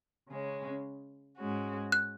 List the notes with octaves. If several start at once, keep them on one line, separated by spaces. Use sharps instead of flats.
C#3 G#3 C#4
G#2 G#3 C#4 F#4
F#6